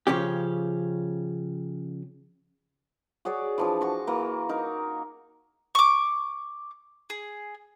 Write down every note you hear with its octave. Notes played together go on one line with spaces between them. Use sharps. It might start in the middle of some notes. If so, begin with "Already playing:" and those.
C#3 F3 C#4 G4
F#4 G#4 C#5 D5
E3 F3 D4
F#4 C#6 D6
E3 A#3
D#4 A#4
C#6 D6
G#4